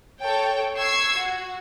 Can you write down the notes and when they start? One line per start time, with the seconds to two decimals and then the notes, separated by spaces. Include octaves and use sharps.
0.22 A4 C#5 G5
0.80 C#6 E6 G#6 C7
1.17 F#4